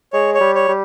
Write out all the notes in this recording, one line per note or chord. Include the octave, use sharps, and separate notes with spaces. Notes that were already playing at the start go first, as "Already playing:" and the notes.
G#3 C#5
C#5
G3
C#5
G3